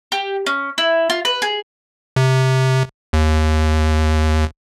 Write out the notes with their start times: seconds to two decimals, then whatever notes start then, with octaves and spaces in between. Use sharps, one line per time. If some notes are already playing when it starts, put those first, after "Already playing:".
0.12 G4
0.46 C#4
0.78 E4
1.10 F4
1.25 B4
1.42 G#4
2.16 C3
3.13 D#2